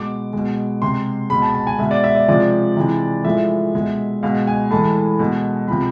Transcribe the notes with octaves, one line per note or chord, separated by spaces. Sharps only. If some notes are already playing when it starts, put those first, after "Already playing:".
Already playing: B2 G#3 D6
B2 G#3
C3 G#3 C6
B2 G#3 B5
A5
A5
G#5
B2 G#3 E5
D5
E5
D5
C3 F3 G#3 D5
C3 E3 G#3
A2 F3 G#3 E5
B2 G#3
B2 G#3 F5
G#5
A2 E3 G#3 A5
B2 G#3
C3 F3 G#3 B5